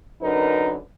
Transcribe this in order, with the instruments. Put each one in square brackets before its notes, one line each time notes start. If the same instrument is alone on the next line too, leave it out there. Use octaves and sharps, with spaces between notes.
[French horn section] F#2 D3 D#4 A#4 B4